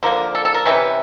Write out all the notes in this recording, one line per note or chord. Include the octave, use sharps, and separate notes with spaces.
D3 F3 A#3 A#4
A4
A4
A#4
C3 E3 G#3 C#4 B4